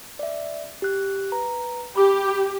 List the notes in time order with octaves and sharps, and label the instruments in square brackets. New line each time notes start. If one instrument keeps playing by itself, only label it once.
[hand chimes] D5 E5
G4 F#6
B4 A#5
[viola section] G4 [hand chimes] B5 D6